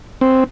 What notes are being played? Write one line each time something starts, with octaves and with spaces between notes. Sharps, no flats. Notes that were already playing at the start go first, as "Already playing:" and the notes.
C4